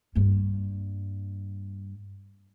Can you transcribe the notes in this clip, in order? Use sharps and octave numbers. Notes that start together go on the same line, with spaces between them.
G2 A#3